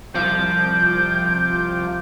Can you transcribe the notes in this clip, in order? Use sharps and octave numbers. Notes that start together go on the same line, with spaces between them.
C2 F3 D6 G6